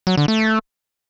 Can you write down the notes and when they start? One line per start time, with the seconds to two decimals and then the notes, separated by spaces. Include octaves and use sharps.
0.07 F#3
0.17 D3
0.28 A3